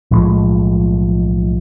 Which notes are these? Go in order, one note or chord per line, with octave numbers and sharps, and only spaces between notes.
B1 A2 F3 G#3